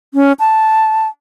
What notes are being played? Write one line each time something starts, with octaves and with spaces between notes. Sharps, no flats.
C#4
A5